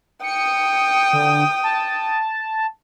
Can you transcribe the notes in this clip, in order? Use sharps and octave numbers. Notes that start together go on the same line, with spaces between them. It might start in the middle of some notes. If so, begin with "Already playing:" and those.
G5 D#6 C#7
D3
A5